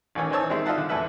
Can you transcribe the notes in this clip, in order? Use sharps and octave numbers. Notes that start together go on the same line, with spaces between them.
A1 D#3 E3 C#4 G#5
E3 D#4 C5 C#5 A5 E6
D#3 G#3 C4 D#4 E4 G#4
D#4 F4 D#5 E5 F#5 A5
D3
E2 E4 A4 B4 E5 F#6